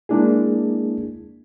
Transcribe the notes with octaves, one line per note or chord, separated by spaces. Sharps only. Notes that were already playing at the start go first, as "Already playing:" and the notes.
G#3 A#3 D4 E4 G#4